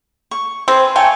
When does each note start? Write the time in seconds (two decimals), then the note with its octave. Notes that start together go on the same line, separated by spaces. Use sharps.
0.31 C#6
0.68 C4 G#4 B4 C5
0.96 A3 C#5 G5 G#5